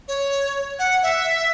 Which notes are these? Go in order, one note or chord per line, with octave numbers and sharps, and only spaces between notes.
C#5
F#5
E5